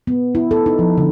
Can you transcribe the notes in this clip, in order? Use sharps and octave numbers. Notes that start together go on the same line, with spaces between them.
B3
E4
A4
D#4
F3
D3